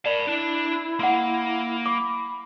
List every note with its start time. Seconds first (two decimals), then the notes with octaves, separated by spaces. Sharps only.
0.05 A#4 D5 A5 B5
0.27 D4 E4 A5
0.99 A#3 F#5 C6
1.86 B5 D6